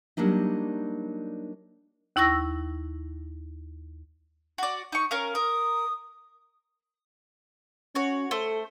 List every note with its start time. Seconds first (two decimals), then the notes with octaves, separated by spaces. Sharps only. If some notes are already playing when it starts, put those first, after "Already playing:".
0.17 F#3 G3 A#3 D4 D#4
2.16 D#2 E4 C#6 E6 A#6
4.58 F#4 D5
4.92 D#4 C#6
5.11 C#4 A#4 F5
5.35 A#4 D#6
7.95 C#4 F#4 C#5
8.31 A3 A4 C5